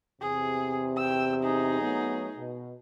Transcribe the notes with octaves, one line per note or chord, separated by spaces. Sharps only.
E2 C3 G#4
G5 E6
D#4 G#4
F#3 A3 B3
B2